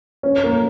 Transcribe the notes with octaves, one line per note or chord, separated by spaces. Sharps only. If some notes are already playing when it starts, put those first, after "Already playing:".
C#4
A#3